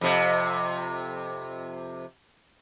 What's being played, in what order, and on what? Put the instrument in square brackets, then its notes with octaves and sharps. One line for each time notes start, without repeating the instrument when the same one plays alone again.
[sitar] F2 C3